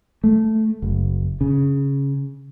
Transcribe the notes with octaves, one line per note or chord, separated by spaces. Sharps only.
A3
F#1
C#3